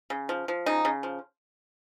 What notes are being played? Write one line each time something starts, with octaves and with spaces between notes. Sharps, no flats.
C#3
F3
F3
C#3 D#4
C#3
F3